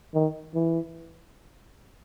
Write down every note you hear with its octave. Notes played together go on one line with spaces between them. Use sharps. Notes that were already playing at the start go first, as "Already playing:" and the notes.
D#3
E3